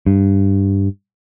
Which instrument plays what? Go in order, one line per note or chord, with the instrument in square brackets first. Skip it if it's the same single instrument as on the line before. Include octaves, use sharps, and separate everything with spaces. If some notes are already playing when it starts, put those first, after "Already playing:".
[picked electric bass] G2